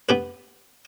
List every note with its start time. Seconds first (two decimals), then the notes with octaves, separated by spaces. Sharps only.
0.09 B3 G4 B4